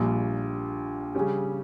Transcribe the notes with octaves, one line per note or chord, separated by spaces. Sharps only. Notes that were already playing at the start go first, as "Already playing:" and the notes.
Already playing: A#1 A#2 G3
C#3 G3 C#4 G4